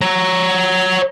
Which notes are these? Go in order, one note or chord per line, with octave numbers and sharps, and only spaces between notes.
C#5 A#5